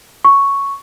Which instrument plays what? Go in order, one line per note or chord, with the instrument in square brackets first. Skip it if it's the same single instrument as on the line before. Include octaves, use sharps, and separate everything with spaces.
[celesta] C#6